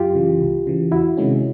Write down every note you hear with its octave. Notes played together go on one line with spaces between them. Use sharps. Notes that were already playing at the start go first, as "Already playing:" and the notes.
Already playing: F#2 F4 G4
C#3 E3
C#2
C#3 E3
E2 E4 F#4
C3 D#3 G#3 C#4